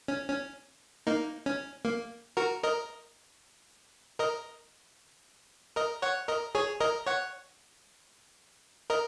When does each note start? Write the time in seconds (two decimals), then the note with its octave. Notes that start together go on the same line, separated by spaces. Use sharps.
0.08 C#4
0.28 C#4
1.07 A#3 D#4
1.46 C#4
1.85 A#3
2.37 F#4 A#4
2.63 A#4 D#5
4.19 A#4 D#5
5.76 A#4 D#5
6.02 C#5 F#5
6.28 A#4 D#5
6.55 G#4 C#5
6.80 A#4 D#5
7.07 C#5 F#5
8.90 A#4 D#5